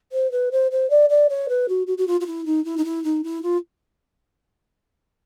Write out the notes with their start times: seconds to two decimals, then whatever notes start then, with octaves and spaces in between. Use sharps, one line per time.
0.12 C5
0.32 B4
0.52 C5
0.71 C5
0.90 D5
1.09 D5
1.29 C#5
1.49 B4
1.68 F#4
1.87 F#4
1.98 F#4
2.07 F4
2.20 F4
2.26 E4
2.46 D#4
2.65 E4
2.77 D#4
2.85 E4
3.04 D#4
3.24 E4
3.43 F4